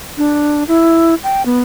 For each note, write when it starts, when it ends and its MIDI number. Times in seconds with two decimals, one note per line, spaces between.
0.18 0.64 62
0.68 1.15 64
1.24 1.42 79
1.46 1.62 59